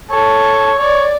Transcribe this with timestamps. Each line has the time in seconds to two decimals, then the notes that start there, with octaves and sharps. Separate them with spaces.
0.10 A4 C#5
0.79 C#5 D5